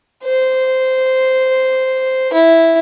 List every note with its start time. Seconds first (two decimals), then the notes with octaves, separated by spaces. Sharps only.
0.24 C5
2.33 E4